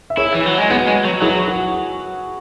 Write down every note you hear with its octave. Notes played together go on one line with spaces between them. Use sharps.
E5
E4 G#4 C#5
E3
F#3
G#3
B3 F#4 B4
G#3
F#3
F#3 E4 G#4
F#4